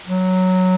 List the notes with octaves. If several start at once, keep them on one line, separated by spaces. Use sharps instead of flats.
F#3